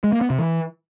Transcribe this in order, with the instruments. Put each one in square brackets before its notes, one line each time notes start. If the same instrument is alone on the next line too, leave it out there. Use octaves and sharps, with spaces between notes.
[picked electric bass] G#3
A#3
B3
C3
E3